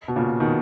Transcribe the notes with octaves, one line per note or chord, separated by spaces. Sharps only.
B2
A#2 C#3
B2 D#3